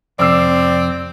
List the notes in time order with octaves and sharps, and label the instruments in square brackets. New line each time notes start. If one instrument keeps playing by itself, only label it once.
[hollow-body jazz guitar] F2 C3 [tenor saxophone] C4 [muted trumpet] D5 [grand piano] D6 E6 C7